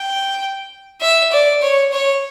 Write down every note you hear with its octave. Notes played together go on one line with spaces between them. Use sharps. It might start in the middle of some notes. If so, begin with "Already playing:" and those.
Already playing: G5
E5
D5
C#5
C#5